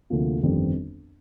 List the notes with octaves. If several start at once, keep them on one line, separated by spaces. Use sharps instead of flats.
D2 C3 F3 A#3
G1 F2 D#3 G3 C4